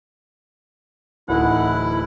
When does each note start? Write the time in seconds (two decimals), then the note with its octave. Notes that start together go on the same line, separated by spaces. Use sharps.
1.29 D1 E3 D#4 E4 F#5